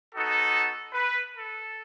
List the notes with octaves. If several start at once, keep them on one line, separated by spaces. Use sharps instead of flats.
B3 D#4 F#4 A4
B4
A4